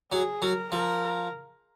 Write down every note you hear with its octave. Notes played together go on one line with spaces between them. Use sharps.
F#3 G#4
F#3 A#4
F3 A#4